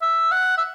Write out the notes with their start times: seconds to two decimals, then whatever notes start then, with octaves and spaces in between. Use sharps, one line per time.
0.02 E5
0.32 F#5
0.58 E5